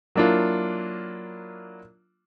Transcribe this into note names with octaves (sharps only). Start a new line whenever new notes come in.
F#3 A#3 D4 E4 F4